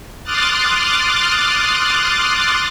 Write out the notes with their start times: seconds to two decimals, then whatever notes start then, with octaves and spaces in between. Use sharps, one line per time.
0.23 C6 D6 D#6 F6 F#6 A6